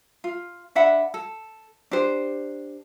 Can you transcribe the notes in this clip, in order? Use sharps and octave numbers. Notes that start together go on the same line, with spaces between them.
F4
D4 E5 F#5 B5
A4
D4 G4 C5